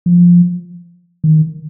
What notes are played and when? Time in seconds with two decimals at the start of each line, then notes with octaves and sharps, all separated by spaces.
0.06 F3
1.24 D#3